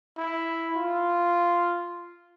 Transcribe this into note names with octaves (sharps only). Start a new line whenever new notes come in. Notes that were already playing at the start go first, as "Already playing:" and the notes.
E4
F4